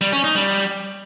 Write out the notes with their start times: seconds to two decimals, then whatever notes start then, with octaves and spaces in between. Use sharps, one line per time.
0.01 G3
0.13 C#4
0.24 D#4
0.35 G3